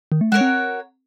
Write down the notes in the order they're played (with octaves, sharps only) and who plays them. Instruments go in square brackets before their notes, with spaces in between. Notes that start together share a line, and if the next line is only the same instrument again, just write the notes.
[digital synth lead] D#3
A3
[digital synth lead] G#3 [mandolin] F#4 A#4 C#5
[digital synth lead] C4